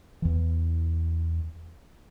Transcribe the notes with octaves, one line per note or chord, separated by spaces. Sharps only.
E2 E3